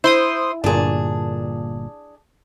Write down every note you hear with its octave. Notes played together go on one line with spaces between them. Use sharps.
E4 C5 C6 D#6
G1 A#2 D4 G#4